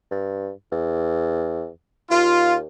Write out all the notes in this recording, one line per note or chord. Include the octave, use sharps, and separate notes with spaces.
G2
E2
D#2 F4